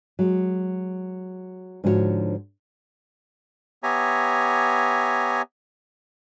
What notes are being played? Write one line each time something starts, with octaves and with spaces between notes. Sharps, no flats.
F#3 G#3
G#2 D3 F3 F#4 G#4 C#5
B3 G4 C#5 E5 G#5 A#5